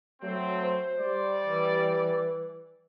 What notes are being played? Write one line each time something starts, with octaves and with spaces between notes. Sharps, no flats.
F#3 A3 C4
C5
G3 D5
E3